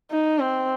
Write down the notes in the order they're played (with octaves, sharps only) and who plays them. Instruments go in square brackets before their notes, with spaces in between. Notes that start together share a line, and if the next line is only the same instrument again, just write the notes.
[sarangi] D#4
C4